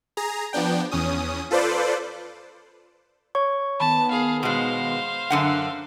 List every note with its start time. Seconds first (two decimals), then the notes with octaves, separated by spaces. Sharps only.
0.17 G#4 A#5
0.53 F3 B3 D4 G5
0.91 E2 C#4 D#6
1.51 F4 A4 B4 C5 D5
3.35 C#5 C#6
3.80 D#3 B3 A5 B5
4.12 G#4 F5
4.43 B2 G#3 C5 F5
5.30 F#2 D3 F#5 E6 F#6